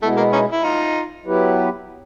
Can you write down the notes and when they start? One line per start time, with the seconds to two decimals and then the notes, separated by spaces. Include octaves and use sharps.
0.01 B2 G#3 A3 B3 E4
0.17 A#3
0.33 C#4 D#4
0.52 E4
0.63 D#4 F4
1.26 F#3 B3 E4 G4 B4